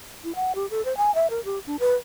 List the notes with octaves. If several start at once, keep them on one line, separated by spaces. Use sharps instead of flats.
E4
F#5
G4
A4
C5
G#5
E5
A#4
G4
D4
B4